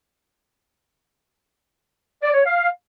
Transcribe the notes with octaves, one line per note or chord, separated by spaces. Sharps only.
D5
C#5
F5